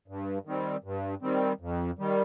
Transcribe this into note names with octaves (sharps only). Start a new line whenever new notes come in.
G2
D#3 G3 C4
G2
D#3 G3 C4
F2
D#3 G3